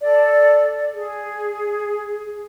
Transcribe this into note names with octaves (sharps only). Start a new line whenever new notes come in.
A4 D5
G#4